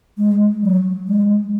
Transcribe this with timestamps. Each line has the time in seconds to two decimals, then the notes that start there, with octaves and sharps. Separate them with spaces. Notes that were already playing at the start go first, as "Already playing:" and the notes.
0.18 G#3
0.63 F#3
1.08 G#3